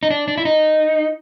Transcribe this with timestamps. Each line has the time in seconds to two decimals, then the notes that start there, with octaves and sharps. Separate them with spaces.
0.03 D#4
0.10 D4
0.28 D4
0.37 E4
0.45 D#4